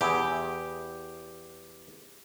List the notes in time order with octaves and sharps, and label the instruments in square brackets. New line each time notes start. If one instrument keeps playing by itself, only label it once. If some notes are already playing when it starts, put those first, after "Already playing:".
[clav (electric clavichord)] E2 E4 G#4 [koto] G4